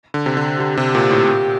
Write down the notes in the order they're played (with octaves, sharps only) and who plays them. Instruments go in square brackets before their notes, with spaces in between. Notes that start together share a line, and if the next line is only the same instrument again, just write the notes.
[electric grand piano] D3
C3
D3
[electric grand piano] D3 [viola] G4
[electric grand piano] C3
A#2
A2
A#2